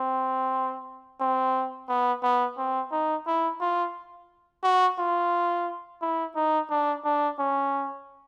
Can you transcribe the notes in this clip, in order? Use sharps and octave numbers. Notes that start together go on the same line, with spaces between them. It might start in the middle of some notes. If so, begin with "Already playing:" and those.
Already playing: C4
C4
B3
B3
C4
D#4
E4
F4
F#4
F4
E4
D#4
D4
D4
C#4